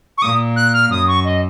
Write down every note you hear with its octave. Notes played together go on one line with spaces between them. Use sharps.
C#6
A#2 D#6
F#6
F6
F#2 D#6
C#6
D#5